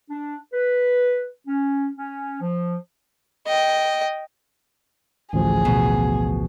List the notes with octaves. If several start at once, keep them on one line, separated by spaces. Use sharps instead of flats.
D4
B4
C#4
C#4
F3
D#5 G5
A1 D2 F3 G#4
B2